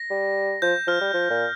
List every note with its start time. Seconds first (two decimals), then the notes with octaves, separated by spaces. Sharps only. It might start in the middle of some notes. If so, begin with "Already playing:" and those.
Already playing: A#6
0.10 G3
0.62 F3 G6
0.87 F3 F6
1.01 G3
1.14 F3
1.30 A#2